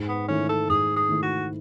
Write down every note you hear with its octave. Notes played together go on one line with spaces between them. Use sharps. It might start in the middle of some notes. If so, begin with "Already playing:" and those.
Already playing: G#2
B3
D#3 A3 C#4 E4
A4
G#2 G#4
G#4
D#3 A3 E4
F#4